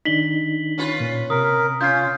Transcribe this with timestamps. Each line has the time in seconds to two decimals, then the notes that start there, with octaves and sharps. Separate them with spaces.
0.05 D#3 D4 D#4 B6 F#7 G7
0.78 C#4 F4 B4
1.00 A#2
1.30 C3 A#4 D#6
1.81 C#4 F4 G6 C7